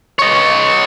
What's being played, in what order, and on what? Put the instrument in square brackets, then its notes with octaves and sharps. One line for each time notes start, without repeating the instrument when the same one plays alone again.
[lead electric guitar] C#5 D#5